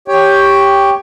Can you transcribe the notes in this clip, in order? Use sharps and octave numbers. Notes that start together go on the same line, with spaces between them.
G4 C#5 G5